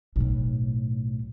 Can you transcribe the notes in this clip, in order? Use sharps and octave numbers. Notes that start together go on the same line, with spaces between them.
B1 A2